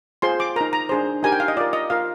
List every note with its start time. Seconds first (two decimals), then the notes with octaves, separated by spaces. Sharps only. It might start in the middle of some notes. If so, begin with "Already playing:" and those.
0.22 F4 G#4 C5 C6
0.40 D6
0.56 D#4 A#4 A#5
0.73 A#5
0.89 D4 G#4 C5
1.23 D#4 G4 A#4 G#5
1.32 G5
1.40 F5
1.48 D#5
1.57 F4 A#4 D5
1.73 D#5
1.90 F4 A#4 F5